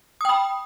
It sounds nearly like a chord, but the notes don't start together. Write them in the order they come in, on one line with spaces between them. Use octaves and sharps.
D#6 G5 B5